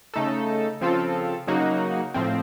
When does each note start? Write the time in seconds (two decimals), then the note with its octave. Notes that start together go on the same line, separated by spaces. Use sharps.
0.14 C#3 A3 D#4 A4
0.81 C#3 F3 C4 F4 A4
1.47 C#3 F#3 A#3 D#4 F#4
2.14 A2 F3 C4